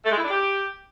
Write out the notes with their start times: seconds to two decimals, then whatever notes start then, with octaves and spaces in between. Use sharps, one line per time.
0.05 A3
0.11 G#3
0.18 E4
0.24 D4
0.30 G4